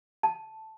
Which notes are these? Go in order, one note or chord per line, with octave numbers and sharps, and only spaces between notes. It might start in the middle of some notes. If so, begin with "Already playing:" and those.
A5